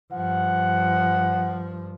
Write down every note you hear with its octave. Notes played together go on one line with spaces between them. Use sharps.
G2 F3 F#5